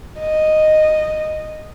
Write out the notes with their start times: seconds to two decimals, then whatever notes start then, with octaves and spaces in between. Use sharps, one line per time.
0.19 D#5